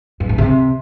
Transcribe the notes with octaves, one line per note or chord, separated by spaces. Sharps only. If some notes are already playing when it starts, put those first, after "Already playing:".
G2
G#2
C3